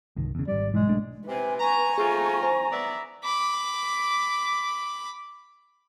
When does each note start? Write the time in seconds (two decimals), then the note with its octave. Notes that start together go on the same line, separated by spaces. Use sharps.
0.16 G1 C2 D#3
0.35 E2 C#3
0.48 G#1 G3 D5
0.74 B1 G#2 E3 G#3
0.87 B1 A3 D4
1.28 C3 B4 G#5
1.59 G#5 A#5 C#6
1.98 A3 C4 F4 G#4 A#5
2.43 C5
2.72 B3 D5 E5
3.24 B5 D6